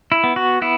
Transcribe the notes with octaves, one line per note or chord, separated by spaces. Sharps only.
E4
B3
F#4
B3 E4